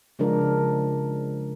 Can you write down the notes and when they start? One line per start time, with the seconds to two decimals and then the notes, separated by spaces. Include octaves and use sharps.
0.19 C#3 F3 G#3 D4 A#4